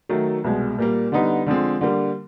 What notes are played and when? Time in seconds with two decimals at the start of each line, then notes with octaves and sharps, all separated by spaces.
0.09 D#3 F#3 A3
0.44 C2 B2 G#3
0.78 A#2 G3 A#3
1.12 D3 G3 B3 D#4
1.46 D3 F3 G#3 C4
1.81 D3 G3 A#3